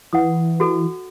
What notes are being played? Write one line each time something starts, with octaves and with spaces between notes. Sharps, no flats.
E3 F#5 D#6
F#4 A4